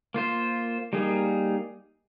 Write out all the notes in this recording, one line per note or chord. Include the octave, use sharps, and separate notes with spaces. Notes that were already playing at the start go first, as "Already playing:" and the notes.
A#3 F4 C5
G3 A#3 D#4 G#4